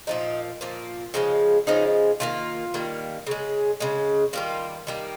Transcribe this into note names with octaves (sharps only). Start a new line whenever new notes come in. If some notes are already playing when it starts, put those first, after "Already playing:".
A#2 F3 A#3 D#4
A#2 F3 A#3
C#3 F3 G#3 D#4
C#3 F3 G#3 D#4
D#3 G3 A#3 F4
D#3 G3 A#3
C#3 G#3
C#3 G#3
D#3 G3 A#3 F4
D#3 G3 A#3